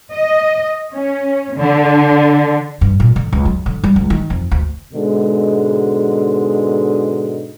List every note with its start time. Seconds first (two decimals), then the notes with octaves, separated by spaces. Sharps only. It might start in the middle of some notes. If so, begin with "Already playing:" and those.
0.13 D#5
0.93 C#4
1.56 D3
2.81 G2
3.00 A#2
3.16 D3
3.33 C#2
3.45 F#3
3.66 D3
3.84 G3
3.96 C#2
4.10 D#3
4.30 F2
4.52 D2
4.94 G#2 B2 D3 G#3